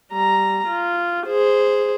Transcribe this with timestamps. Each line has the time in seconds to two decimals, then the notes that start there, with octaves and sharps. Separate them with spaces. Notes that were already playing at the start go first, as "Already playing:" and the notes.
0.12 G3 A#5
0.67 F4
1.27 G#4 C5